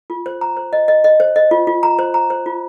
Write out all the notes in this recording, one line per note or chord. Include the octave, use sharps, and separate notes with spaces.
F4
C5
A#5
C5
D#5
D#5
D#5
C5
D#5
F4
F4
A#5
C5
A#5
C5
F4